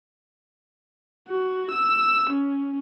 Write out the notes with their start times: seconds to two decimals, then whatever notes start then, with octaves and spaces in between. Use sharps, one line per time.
1.29 F#4
1.71 E6
2.30 C#4